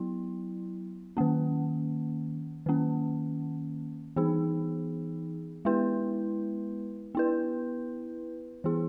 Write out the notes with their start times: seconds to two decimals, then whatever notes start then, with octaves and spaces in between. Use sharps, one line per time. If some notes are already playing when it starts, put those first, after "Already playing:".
Already playing: F#3 B3 E4
1.17 D#3 A#3 C#4
2.66 D#3 A#3 C#4
4.16 E3 B3 D#4 G#4
5.65 G#3 B3 E4 B4
7.15 B3 E4 B4
8.64 E3 B3 E4 G#4